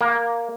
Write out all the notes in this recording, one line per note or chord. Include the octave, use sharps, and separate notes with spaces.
A#3